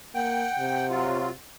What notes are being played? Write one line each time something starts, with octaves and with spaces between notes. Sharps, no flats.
A#3 F#5 G5
C3
F#3 F4